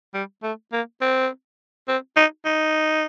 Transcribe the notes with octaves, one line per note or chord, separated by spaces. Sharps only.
G3
A3
A#3
C4
C4
D#4
D#4